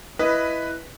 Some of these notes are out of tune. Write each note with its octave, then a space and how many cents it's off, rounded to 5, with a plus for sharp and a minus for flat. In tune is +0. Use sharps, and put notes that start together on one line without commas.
E4 +10 B4 +0 D#5 +0